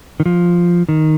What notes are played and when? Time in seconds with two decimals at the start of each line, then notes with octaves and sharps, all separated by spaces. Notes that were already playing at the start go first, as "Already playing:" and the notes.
0.20 D#3
0.26 F3
0.89 D#3